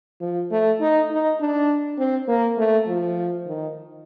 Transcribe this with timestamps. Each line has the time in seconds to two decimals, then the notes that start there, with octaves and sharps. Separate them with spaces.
0.21 F3
0.51 A3
0.80 D#4
1.11 D#4
1.40 D4
1.98 C4
2.28 A#3
2.58 A3
2.87 F3
3.46 D#3